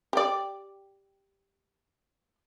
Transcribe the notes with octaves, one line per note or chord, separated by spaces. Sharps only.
G4 D5